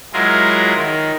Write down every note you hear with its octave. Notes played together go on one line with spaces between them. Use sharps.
F#3 G#3 E4 F4 G#4 A#4
D#3